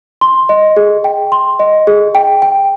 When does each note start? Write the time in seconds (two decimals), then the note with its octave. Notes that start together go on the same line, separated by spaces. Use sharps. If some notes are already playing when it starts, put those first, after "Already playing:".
0.21 C6
0.49 D#5
0.77 G#4
1.04 G5
1.32 C6
1.59 D#5
1.87 G#4
2.15 G5
2.42 G5